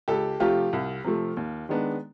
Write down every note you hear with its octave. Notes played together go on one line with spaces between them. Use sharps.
C#2 G4 A4
C3 F3 A3 F4 G4
C2
C3 F3 A3
D#2
D#3 G#3 B3 D4